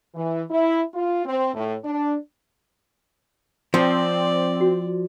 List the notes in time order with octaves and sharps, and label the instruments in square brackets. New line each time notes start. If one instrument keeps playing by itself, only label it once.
[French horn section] E3
E4
F4
C4
A2
D4
[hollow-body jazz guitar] F3 [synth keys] C4 [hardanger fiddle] D5
[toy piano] F#4